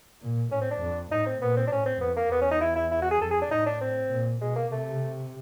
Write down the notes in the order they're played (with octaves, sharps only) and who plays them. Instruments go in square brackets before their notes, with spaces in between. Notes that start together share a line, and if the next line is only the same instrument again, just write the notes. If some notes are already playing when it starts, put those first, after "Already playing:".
[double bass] A#2
[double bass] A2 [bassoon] C#4
[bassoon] C4
D4
[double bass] F2
[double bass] A2 [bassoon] D#4
[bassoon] C4
[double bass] A#2 [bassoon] B3
[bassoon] C4
D4
[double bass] A2 [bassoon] C#4
[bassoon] C4
[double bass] F2 [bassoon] B3
[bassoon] A#3
[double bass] E2 [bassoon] B3
[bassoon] C#4
D#4
E4
E4
E4
F#4
G#4
[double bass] F2 [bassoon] A4
[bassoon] G#4
D4
[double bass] A2 [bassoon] D#4
[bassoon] D4
C4
[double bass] A#2
[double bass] B2 [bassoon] G#3
[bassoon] A#3
[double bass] C3 [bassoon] A3